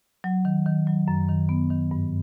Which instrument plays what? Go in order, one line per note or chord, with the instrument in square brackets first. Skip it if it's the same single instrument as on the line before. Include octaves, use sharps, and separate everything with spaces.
[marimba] F#3
D#3
D#3
F#3
F#2
D#3
B3
D#3
G2